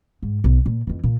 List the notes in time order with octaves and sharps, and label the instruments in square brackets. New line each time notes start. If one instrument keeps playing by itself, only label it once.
[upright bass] G#2
B1
A#2
F2 E3
A#2